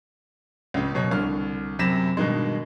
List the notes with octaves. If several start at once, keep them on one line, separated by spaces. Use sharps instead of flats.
C#2 C#3
F#2 B2 C#5
C2 D3 F6
F#2 C3 B5 A#6 B6 E7
G2 B2 D#3 G#3